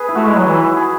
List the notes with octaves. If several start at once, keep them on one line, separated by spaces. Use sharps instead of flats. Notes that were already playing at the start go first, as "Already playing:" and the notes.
Already playing: G#4 B4
E4
A3 F#4
G#3
F#3
E3 E4
G#4